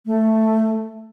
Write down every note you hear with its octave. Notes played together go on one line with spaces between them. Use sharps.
A3